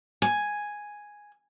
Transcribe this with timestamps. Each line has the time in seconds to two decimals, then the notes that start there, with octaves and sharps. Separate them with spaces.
0.22 G#5